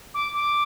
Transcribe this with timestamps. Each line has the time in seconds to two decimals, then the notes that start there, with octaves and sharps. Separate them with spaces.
0.14 D6
0.34 D6